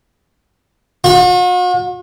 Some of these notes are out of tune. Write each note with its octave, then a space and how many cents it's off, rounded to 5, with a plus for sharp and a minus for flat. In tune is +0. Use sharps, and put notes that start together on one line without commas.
F#4 -45